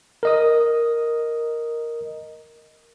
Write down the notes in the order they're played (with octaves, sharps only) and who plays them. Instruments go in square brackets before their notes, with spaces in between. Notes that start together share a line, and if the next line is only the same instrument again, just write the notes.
[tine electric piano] A#4 D#5 D#6